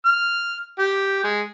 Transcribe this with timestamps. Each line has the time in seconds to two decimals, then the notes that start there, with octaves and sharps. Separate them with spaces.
0.06 F6
0.79 G4
1.24 G#3